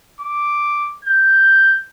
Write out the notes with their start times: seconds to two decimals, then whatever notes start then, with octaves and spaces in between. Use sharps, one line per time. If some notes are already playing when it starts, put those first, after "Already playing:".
0.21 D6
1.05 G6